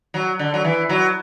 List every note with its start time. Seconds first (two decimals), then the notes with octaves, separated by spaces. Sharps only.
0.14 F#3
0.39 D3
0.54 F#3
0.64 E3
0.89 F#3